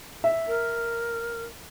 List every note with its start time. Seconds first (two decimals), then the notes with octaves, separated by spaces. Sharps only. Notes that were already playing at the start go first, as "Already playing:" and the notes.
0.24 E5
0.48 A#4